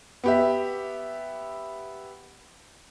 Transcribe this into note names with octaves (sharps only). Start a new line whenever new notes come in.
B3 G4 E5